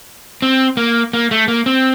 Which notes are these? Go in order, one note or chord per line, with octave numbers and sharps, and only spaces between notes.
C4
A#3
A#3
A3
A#3
C4